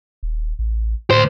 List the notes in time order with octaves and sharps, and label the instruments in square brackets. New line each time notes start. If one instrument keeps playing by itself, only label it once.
[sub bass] D#1
A1
[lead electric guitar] D2 C5 [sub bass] A2